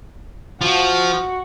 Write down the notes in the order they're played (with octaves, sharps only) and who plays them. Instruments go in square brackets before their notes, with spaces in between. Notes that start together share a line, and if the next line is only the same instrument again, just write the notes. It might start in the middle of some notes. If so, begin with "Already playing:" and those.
[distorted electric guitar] F3 [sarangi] F#4